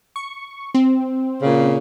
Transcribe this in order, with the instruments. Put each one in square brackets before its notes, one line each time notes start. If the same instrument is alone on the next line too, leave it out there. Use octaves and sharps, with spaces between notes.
[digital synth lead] C#6
C4
[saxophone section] A#2 C#3